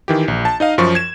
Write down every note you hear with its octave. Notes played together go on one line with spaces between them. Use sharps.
D#3 E3 G4
A#1
A5
D#4 D#5 F5
F#2 F3 C#6
G#6 E7